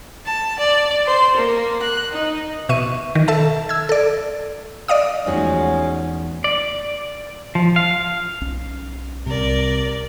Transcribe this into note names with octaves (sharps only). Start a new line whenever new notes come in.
A5
D5
C5
A#3
F#6
D#4
B2 E5 C#6 D#7
D#3
A4 E5 A5
E6 G#6
A4 D5
D5 D#5 F5 D#6
E2 F3 G#3 A3 C#4 D#4 F#4
D5
F3
F5
B1 C#4
C2 C3 A#4 D5